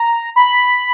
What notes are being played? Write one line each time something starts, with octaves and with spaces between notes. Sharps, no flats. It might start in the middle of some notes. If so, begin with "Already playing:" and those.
Already playing: A#5
B5